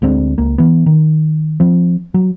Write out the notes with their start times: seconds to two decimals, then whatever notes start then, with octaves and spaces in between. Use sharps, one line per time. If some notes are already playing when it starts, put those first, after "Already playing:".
0.02 D2 G#3 C4 D4
0.38 C#2 A#3
0.58 E3 B3
0.86 D#3
1.60 F3 C4
2.14 F#3